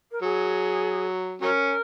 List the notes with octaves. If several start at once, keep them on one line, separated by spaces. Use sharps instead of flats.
A#4
F#3 G#4
F#3 C#4 A#4